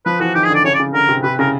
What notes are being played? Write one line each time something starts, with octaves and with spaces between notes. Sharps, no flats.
F3 B4
E3 F#4
D#3 G4
G#4
D3 D5
C#3 C#5
D5
C#3
D3 A#4
C3
C3 B4
C#3 A#4